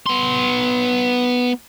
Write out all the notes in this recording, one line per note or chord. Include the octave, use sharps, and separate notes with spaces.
B3 C6